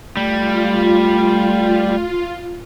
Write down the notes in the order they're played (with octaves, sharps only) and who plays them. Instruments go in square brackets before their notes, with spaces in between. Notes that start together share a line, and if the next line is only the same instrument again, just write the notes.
[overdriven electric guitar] G3 [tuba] A3 [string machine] F4